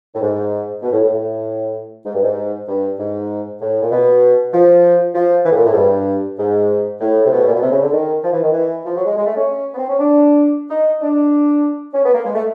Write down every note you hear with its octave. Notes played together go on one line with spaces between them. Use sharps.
A2
G#2
B2
A2
A2
A2
G#2
G2
G#2
G2
G#2
A2
A#2
B2
F3
F3
E3
A2
A#2
A2
G#2
G2
G#2
A2
C3
B2
A2
A#2
B2
C3
C#3
D3
D#3
F3
E3
D#3
E3
F3
F#3
G#3
G#3
A3
C#4
B3
C4
C#4
D4
D#4
D4
C#4
B3
A#3
G#3
A3